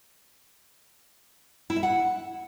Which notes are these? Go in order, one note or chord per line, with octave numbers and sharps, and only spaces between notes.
E4
E5
F#5